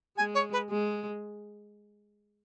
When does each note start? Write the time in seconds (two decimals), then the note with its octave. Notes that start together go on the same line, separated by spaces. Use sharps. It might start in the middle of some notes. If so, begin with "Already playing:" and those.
0.18 G#3 G#5
0.35 C#5
0.53 B4
0.70 G#3